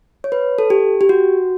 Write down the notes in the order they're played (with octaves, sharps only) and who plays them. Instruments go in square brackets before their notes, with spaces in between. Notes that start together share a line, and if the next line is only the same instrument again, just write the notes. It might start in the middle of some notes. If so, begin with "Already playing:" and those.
[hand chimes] C#5
B4
A4
G4
G4
F#4